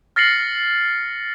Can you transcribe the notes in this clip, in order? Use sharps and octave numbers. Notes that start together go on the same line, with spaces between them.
F6 A6 A#6 C7 C#7 F#7